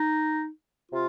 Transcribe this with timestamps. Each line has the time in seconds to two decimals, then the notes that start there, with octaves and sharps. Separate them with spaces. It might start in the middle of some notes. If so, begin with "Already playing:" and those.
Already playing: D#4
0.92 C3 F4